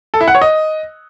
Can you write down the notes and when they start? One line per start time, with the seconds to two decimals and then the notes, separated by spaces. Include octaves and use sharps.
0.14 A4
0.21 E4
0.28 F#5
0.35 C#5
0.42 D#5